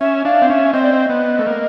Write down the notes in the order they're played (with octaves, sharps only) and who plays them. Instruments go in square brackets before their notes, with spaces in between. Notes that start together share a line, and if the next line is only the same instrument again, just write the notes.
[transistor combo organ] C#4 [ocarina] E5
[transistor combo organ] D4 [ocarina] F5
[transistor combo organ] C4
[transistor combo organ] C#4 [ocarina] E5
[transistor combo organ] C4 [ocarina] D#5
[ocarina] D5
D#5
[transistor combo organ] B3
A3
A#3